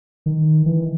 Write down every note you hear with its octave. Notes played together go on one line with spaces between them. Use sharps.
D#3
E3